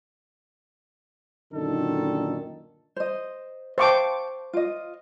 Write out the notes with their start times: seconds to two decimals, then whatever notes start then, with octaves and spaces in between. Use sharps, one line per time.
1.53 F#2 A#2 D3 D#3 D#4 A4
2.96 C5 D#5
3.78 C5 F5 G5 A5 C#6 D6
4.53 F4 D#5